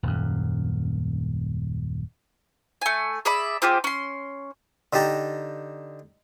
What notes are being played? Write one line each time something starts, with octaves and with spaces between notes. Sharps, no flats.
D#1 F#2
A3 G#5
G#4 D5 E5 B5
C4 F4 G4 G#4
C#4 C6
D3 D#4 G4 A5 A#5